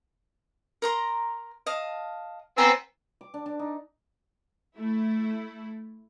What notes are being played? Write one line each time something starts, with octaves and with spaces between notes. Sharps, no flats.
A#4 A#5 C6
D#5 F5 A5
B3 C4 D5 G#5 A#5 E6
D6
D4
D4
D#4
A3 E4